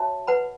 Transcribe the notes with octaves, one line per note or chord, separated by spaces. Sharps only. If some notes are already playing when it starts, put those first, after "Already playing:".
Already playing: F#4 C#5 E5 A5
B4 F#5 B5